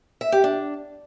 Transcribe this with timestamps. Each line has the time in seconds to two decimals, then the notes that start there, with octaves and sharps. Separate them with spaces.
0.21 E5
0.32 G4
0.44 D4